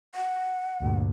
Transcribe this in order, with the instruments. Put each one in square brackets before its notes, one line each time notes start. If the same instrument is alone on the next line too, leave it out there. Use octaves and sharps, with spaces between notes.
[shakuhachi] F#5
[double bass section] D2 G2 A#2